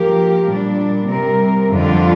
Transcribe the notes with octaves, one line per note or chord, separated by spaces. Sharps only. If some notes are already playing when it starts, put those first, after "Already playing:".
Already playing: F3 A#3 G4 A#4
A#2 G3 D4
C3 G3 C4 A#4
F2 D3 G3 D4 F4